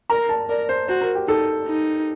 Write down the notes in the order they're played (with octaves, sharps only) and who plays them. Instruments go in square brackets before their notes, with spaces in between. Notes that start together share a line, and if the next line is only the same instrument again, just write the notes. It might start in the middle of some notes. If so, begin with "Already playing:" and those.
[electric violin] A#4 [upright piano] A#5
[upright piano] A5
[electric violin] A#4 [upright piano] D5
[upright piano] C5
[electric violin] F#4 [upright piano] C5
[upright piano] A#4
G4
[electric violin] D#4 [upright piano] A4
[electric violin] D#4